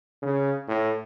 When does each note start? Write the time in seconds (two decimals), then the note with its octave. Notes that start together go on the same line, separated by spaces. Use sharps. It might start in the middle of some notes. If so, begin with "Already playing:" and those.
0.22 C#3
0.68 A2